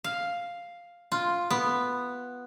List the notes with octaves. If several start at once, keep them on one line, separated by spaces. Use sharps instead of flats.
F5
F4
B3